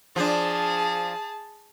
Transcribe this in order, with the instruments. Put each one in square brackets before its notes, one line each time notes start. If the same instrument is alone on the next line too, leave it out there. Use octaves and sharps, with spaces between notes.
[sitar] F3 D4 [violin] G#4 A5